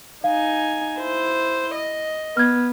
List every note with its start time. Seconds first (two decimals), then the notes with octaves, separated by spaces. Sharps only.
0.24 D#4 F5 G#5
1.00 E4 C5
1.75 D#5
2.37 B3 F6 G#6